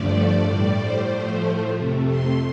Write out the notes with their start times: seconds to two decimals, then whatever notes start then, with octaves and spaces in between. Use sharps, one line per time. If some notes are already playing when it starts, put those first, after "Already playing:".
Already playing: G2 D3 F3 A3 D5
0.44 A2 G3
0.76 C5
1.10 A2 F3 A3
1.75 F2 C3 A3
2.08 C6